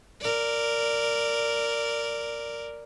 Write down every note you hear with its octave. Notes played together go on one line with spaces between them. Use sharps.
A#4 D5